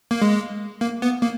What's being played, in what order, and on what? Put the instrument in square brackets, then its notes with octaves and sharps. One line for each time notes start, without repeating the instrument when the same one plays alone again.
[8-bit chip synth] A#3
G#3
A#3
B3
A#3